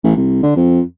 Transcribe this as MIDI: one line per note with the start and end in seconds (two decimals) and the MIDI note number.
0.04 0.12 33
0.16 0.41 36
0.43 0.55 50
0.56 0.80 41